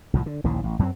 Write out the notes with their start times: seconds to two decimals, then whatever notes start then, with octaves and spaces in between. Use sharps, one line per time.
0.13 C2 A2 F3
0.26 D3
0.44 A#1 D#2 C#3 E3
0.64 A1
0.79 F#2 F#3 A#3 C4